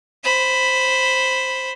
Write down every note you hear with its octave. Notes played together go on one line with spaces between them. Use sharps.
C5 B5